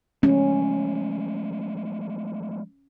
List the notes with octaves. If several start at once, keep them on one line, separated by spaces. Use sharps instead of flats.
F3 G#3 A3 C#4